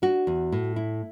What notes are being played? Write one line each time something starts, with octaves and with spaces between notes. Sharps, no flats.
D4 F#4
E2
A2
E4